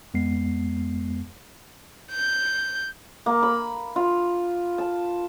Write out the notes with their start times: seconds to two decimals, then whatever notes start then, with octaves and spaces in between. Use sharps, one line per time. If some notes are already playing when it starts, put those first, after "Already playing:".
0.14 F2 G#3 B3 C7
2.12 G6
3.26 A#3
3.43 B5
3.96 F4
4.78 A5